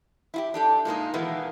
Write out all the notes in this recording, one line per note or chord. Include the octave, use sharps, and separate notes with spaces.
E4 F4 G4
D4 G4 A4
A#2 G#3 A#3 D#4
B2 D#3 E3 G#3 A#3 B3